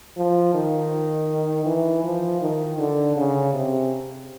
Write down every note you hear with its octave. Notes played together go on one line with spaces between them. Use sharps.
F3
D#3
E3
F3
D#3
D3
C#3
C3